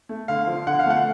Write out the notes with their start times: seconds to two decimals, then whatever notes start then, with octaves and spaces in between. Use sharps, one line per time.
0.09 A3
0.28 D3 F5
0.47 F3
0.67 D3 F#5
0.79 F5
0.86 A3 F#5